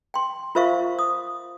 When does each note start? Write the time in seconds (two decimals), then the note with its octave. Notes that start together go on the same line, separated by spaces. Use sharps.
0.14 G5 C6
0.55 F4 A#4 C5 E5 F5 C#6
0.99 D#6